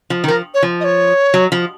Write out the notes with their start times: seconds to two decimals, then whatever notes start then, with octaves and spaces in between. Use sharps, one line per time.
0.10 F3
0.24 D#3
0.27 F3 A#4
0.54 C#5
0.63 F3
0.80 D#5
0.84 C#5
1.34 F#3
1.52 F3